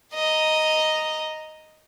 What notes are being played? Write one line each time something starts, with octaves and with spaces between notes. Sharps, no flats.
D#5 A#5